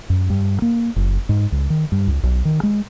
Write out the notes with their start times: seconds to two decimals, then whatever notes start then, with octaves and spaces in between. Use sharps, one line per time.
0.10 F#2
0.30 G2
0.62 A#3
0.96 F#1
1.29 G#2
1.52 C#2
1.70 D#3
1.92 G2
2.08 C#2
2.23 B1
2.45 D#3
2.63 G#3